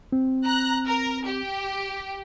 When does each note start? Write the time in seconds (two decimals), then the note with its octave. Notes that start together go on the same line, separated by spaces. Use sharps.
0.12 C4
0.45 A#5 F#6
0.86 A#4
1.26 G4